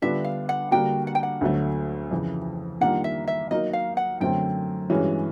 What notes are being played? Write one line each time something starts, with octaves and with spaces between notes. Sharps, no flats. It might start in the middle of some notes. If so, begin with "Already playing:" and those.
D3 G3 B3 D4 F4 E5
F5
F#5
D3 G3 A#3 D4 F#4 G5
F#5
G5
F#5
D2 D3 F#3 A3
F2 C#3 E3
D#3 G3 A#3 D4 F4 F#5
E5
E5
F#3 A#3 D#4 F#4 A#4 D#5
F5
F#5
F#2 D3 F#3 A3 C4 G5
G2 E3 G#3 C#4 F#4